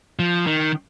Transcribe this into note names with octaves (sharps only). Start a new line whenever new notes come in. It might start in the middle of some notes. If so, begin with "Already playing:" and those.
F3
D#3